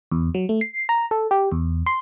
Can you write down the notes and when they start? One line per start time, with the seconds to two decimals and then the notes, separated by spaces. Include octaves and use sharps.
0.12 E2
0.35 F#3
0.49 A3
0.61 C7
0.89 A#5
1.11 A4
1.31 G4
1.52 E2
1.86 C6